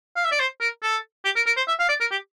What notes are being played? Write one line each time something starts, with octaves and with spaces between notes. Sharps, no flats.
F5
E5
D5
C5
A#4
A4
G4
A#4
A#4
C5
E5
F5
D5
A#4
G4